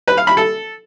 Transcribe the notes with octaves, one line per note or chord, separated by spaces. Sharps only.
B4
F5
B5
A4